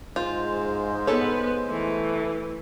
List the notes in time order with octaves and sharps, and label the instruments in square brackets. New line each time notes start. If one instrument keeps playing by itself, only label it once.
[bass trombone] G#2 [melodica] G#3 C5 [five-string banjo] F4
[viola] B3 B4 [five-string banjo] A4 C#5
[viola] E3 [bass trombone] A3